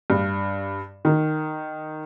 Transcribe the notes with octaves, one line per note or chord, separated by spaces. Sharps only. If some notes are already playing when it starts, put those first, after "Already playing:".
G2
D#3